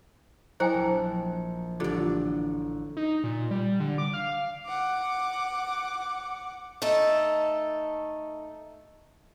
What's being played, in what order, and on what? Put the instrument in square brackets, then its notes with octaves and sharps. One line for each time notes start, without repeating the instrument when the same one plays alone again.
[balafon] F#3 E4 A#5 [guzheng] A#4 [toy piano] C5 G5 G#5
[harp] A#1
[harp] A1 G3 [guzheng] D3 D5 [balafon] F4 G4
[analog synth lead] D#4
A#2
G3
D3
D6
F5
[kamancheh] F#5 D6
[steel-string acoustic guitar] A3 D#4 A4